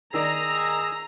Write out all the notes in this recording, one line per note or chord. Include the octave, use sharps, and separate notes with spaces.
D#3 G#4 D5 A#5 E6